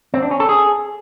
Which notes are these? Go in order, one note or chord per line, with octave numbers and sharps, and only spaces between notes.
C4
D4
C#4
A4
G#4